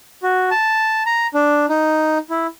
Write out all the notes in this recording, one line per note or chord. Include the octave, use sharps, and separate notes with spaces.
F#4
A5
A#5
D4
D#4
E4